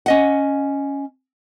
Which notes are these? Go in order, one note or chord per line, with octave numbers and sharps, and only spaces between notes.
C#4 D#5 F#5